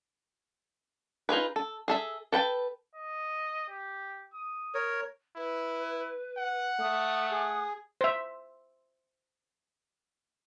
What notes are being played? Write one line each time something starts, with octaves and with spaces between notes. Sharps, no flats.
D#4 F4 G#4 B4
A4
G#4 A4 E5
A4 B4 G5 A5
D#5
G4
D#6
A#4 C#5
E4 B4
F#5
A3 D#6
G#4
C5 E5